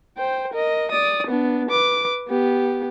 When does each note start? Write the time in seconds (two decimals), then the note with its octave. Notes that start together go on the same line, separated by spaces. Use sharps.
0.18 C5 G5
0.53 A#4 D#5
0.92 D5 D#6
1.27 B3 D4
1.69 B4 D6
2.28 B3 G4